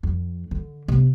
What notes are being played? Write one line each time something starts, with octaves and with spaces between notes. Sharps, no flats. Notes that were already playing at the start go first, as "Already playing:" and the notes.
F2
D3
C3 B3